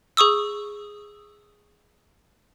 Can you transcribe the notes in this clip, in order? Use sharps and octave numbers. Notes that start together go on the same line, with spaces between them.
G#4 C#6 D#6 E6